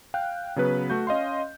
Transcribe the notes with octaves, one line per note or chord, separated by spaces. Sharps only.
F5 G5 F#6
C#3 F#3 B3 B4
A3 F#4 G6
C#4 D#5 F5 C6